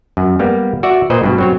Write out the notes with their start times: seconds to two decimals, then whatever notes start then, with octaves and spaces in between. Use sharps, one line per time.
0.17 F#2
0.39 G3 A#3 B3
0.83 F#4 D5 E5
1.10 A#2 B4 C5 D#5
1.24 G2 B2
1.38 F#3 C4 C#5